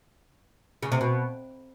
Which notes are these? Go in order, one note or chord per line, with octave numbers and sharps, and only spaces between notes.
C#3
C3
B2